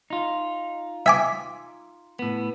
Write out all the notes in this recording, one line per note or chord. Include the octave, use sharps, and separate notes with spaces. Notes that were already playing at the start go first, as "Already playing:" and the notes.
D#4 F4
E5 G#5 D6
A2 B3